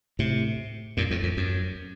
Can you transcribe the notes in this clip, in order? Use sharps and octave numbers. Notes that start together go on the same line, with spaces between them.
A2 C3
F#2 A#2
F2 A2
F2
F#2